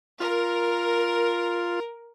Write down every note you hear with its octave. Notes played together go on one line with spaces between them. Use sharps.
F4 A#4